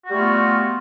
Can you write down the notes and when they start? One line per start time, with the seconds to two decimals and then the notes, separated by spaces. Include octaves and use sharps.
0.04 F#4
0.08 G3
0.12 A3
0.16 F4
0.20 B3